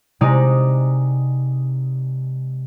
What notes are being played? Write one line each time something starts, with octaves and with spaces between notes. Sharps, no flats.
C3 G#3 D#4 D5